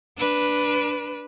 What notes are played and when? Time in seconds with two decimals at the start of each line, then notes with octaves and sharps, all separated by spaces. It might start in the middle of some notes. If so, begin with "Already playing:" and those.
0.18 D4 B4